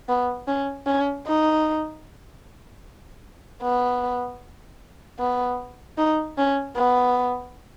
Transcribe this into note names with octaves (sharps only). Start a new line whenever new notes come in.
B3
C#4
C#4
D#4
B3
B3
D#4
C#4
B3